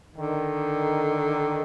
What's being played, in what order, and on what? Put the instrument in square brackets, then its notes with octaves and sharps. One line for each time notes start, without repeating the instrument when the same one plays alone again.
[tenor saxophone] D3 [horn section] D#3